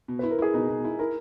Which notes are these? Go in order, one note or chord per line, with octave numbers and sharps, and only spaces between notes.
B2
E4 B4
A#4
E4 G#4
B2 D#4
B2
E4
E4 A#4